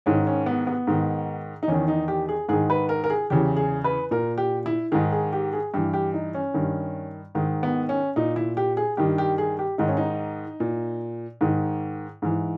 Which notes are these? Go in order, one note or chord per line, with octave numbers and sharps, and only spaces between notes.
G#2 D#3 C#4
C#4
B3
B3
G#2 D#3
D#4
E2 D#3 C#4
D#4
G4
G#4
G#2 D#3 G#4
B4
A#4
A#4
G#4
E2 C#3 E3 G4
G#4
B4
A#2 A#4
G4
E4
G#2 D#3 G#4
G#4
G4
G#4
G2 E3 G4
G4
D#4
C#4
G2 D#3
G#2 D#3
B3
C#4
A#2 D#4
E4
G4
G#4
G2 D#3 G4
G4
G#4
G4
G#2 D#3 D#4
C#4
D#4
A#2
G#2 D#3
G#2 E3